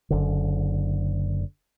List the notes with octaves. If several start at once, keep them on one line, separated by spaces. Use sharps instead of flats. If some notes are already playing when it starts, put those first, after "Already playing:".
F#1 D3